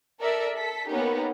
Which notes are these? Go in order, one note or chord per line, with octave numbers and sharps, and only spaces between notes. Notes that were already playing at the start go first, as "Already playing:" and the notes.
A4 A#4 D5 E5
A4 B6
A#3 B3 C#4 D#4 G4 A#4